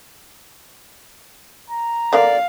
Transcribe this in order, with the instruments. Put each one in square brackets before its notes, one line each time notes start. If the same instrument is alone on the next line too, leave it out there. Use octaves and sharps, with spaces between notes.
[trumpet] A#5
[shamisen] D3 A#3 [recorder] D5 [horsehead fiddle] F5